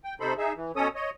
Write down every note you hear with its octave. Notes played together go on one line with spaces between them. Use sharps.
G5
C3 D#4 A4 C5 B5
D#4 G#4 E5
E3
B2 C#4 A4 C#5 D#6
C#5 D#5